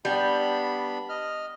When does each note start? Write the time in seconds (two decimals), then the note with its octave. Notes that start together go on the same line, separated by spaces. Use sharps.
0.05 G3 B3 D4 B5
1.09 D#5 F6